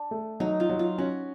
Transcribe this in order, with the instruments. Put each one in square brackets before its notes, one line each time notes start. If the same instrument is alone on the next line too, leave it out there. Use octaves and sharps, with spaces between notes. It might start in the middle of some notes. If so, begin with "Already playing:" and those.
Already playing: [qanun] D4
[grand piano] A3
[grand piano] F#3 [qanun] D#4
[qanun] F4
[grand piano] F#3
[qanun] F4
[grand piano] C#4 [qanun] F#4